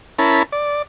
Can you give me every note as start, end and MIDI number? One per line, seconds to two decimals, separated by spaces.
0.19 0.43 61
0.19 0.43 64
0.19 0.43 70
0.19 0.43 81
0.19 0.43 83
0.52 0.82 74